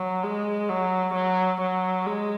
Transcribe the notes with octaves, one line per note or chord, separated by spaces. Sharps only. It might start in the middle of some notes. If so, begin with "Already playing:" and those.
Already playing: F#3
G#3
F#3
F#3
F#3
G#3